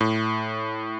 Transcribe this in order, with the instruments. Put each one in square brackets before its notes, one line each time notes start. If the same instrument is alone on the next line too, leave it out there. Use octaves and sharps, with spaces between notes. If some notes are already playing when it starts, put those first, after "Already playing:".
[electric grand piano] A2